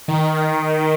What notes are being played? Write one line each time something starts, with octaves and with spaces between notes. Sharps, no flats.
D#3